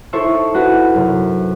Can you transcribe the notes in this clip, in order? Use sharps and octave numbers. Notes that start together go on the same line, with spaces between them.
D#4 E4 A4 C5 E5 C#6
D4 F#4 B4
F#2 C3